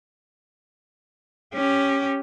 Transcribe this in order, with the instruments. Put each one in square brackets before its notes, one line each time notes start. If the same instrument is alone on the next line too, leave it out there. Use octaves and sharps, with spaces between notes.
[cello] C#4 G4